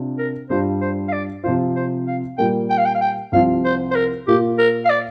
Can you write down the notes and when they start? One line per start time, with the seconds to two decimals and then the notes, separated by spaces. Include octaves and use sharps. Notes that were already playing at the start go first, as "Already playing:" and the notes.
Already playing: C3 D4 F4
0.18 A#4
0.50 G2 G3 D4 F4 C5
0.81 C5
1.08 F5
1.13 D5
1.44 C3 F3 C4 F4 C5
1.76 C5
2.07 F5
2.38 A#2 G3 A#3 G5
2.70 G5
2.78 F5
2.85 G5
2.95 F5
3.01 G5
3.32 C2 C3 F3 C4 F4 F5
3.65 C5
3.91 C5
3.95 A#4
4.27 A#2 A#3 F4 G4
4.58 A#4
4.85 F5
4.89 D5